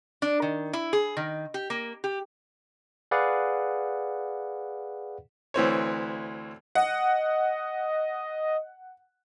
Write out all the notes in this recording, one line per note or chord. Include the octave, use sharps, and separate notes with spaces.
D4
D#3
E4
G#4
D#3
G4
A#3
G4
G#4 B4 D5 F5 F#5
D2 E3 C4 C#5
D#5 F#5